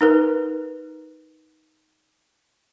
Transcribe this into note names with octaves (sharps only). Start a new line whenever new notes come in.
D#4 A#4 B4